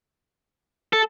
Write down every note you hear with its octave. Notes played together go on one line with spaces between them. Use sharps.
A4